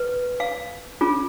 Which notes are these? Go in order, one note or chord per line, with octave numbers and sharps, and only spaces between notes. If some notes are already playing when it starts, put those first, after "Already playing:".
Already playing: B4
F5
C#4 F4 G#4